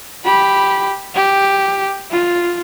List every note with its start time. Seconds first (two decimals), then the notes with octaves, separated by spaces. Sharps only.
0.25 G4 B5
1.15 G4
2.11 F4